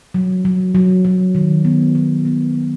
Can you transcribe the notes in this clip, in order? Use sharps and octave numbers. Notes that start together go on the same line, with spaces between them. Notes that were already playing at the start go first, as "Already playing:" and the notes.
F#3
F#3
F#3
F#3
D#3
B3
F#3
B3
B3